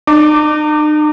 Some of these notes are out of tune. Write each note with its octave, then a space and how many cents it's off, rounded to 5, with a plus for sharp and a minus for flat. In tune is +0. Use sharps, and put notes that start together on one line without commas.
D#4 -45 D6 +0